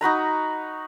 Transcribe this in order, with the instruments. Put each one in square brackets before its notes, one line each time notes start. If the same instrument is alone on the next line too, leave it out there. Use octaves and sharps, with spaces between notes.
[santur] D#4 F#4 B4 A#5